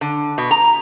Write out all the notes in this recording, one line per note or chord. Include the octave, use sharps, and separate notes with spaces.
D3
B2
A#5